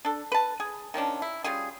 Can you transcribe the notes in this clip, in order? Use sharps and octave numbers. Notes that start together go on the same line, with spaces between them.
D4 A4
B4 A5
G#4
D#3 F3 C#4 D4
E4
G3 C#4 F4 G#4